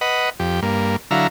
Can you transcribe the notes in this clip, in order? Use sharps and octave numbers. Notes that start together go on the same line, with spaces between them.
B4 D#5 F#5
F2 G4
G2 A#3
D3 F#3 E4 F5 A#5